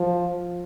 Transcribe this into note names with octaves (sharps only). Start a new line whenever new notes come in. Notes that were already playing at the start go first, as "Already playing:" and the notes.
Already playing: F3